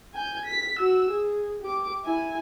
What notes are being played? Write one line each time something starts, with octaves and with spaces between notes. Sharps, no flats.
G#5 G6
B6
F#4 E6
G#4
G4 D6
E4 G#5